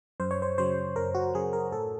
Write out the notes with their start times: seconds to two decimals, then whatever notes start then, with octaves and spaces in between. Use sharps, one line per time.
0.20 F#2 C5
0.31 C#5
0.42 C5
0.58 C#3 F#3 C5
0.96 F#2 A#4
1.15 F#4
1.34 C#3 F#3 G#4
1.53 A#4
1.72 A2 A4